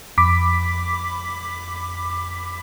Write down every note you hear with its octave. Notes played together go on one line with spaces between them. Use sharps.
F2 B5 D6 B6